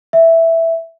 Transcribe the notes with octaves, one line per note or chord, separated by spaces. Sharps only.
E5